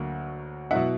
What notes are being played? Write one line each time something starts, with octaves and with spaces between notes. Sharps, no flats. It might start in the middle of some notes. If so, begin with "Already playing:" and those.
Already playing: D2 D3 F#3 A#3
B2 F#3 B3 E4 E5 F#5